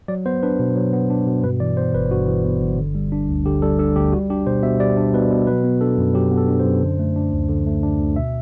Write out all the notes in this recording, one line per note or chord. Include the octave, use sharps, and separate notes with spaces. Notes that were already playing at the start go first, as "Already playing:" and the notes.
F#3 D5
B3 C5
D4 B4
B2
F#3
B3
D4
B2
G2 B4
E3 D5
B3 C5
G1 B4
G2 F#4
E3
B3
G1
D3
G3
D4
D2
D3 G4
G3 A4
D4 A4
D2 G4
G3 F#4
D4 G4
B2 C5
B2 E5
G3 D5
D4
B2 B4
B2
F#3 B4
B3
D4 A4
F#2
F#3 G4
B3
A4
D4
C5
F#2
D3
A3
D4
D2
D3
A3
D4
D2
B2 E5